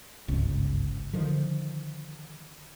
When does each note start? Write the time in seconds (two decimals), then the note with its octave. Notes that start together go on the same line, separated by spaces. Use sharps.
0.28 G1 C#2 G#2
1.13 D3 D#3 F3